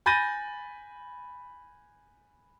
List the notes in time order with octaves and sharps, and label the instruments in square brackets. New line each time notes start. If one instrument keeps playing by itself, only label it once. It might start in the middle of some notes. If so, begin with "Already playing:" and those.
[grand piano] G#5 B5 G6 A6 A#6 D#7